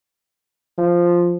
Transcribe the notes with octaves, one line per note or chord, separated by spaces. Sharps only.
F3